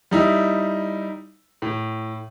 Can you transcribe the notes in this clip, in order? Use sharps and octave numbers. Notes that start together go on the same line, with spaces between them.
G3 D#4 E4
A2